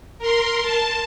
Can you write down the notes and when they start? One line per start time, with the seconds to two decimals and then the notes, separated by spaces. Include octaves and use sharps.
0.19 A#4 C6
0.62 A5